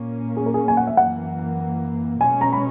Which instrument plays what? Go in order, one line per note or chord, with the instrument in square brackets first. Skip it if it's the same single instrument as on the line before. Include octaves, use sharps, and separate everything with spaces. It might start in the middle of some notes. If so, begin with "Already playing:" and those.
Already playing: [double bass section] A#2 A#3 C#4
[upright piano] G#4
A#4
G#4
G#5
F#5
E5
[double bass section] F#2 E3 A#3 [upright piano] F#5
[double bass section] B2 G#3 C#4 [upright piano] G#5
[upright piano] A#5
B5